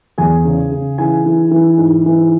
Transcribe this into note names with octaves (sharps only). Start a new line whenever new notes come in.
E2 G#4 G#5
C#3
C#3
E3 G#4 G#5
E3
E3
G#2
E3